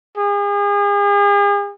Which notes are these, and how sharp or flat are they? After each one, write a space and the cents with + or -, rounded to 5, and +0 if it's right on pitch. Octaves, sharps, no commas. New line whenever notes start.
G#4 -40